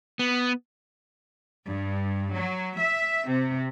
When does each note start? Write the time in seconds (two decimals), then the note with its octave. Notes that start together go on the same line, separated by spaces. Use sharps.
0.19 B3
1.66 G2
2.33 F#3
2.79 E5
3.28 C3